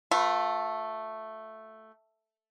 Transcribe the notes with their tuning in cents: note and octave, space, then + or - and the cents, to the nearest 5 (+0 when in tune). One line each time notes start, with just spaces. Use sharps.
A3 +0 F4 +35 B4 +0